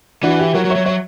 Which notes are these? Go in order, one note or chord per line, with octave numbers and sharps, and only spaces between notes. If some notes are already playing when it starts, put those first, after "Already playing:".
E3 D4 F#4
E4 G4
F#3 F#4 A#4
F#3
C#5 E5
F#3
F#3 C#5 E5